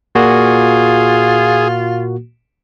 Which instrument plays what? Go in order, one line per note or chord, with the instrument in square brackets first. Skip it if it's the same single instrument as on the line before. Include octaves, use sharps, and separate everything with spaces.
[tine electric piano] A#2 A#3 F#4 [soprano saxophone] F4 [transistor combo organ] G#4